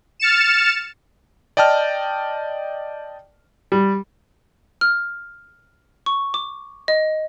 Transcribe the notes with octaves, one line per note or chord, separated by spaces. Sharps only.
F6 A6 C#7 E7
D5 D#5 G5 A5 F6
G3
F6
C#6
D6
D#5